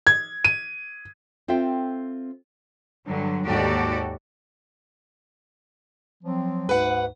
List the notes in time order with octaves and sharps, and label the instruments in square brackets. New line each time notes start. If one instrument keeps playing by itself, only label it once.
[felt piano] G#6
D#7
[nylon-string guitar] C4 F4 A4 C5 E5 G5
[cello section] G2 D3 F#3
D#2 G#2 F#4 G4 A4 D5
[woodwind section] F3 F#3 C4
[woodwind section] D2 G#2 [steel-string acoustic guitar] B4 F#5